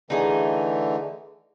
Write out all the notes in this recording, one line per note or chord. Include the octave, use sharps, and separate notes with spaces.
D3 E3 A3 D#4 G#4